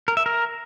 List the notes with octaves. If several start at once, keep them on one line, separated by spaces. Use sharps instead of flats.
A#4
E5
A#4